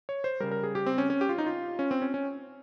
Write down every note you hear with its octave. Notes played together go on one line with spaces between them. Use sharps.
C#5
C5
C#3 G3 A#4
A#4
G#4
G4
C4
C#4
C#4
G4
F4
D#4
F4
C#4
C4
C#4
C#4